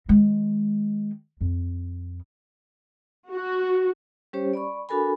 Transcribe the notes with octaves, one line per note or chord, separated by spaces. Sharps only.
D#3 G#3
F2
F#4
G3 C#4 G4 C5 C#5
D5 B5 C#6
D4 F#4 A4 A#4 G#5 B5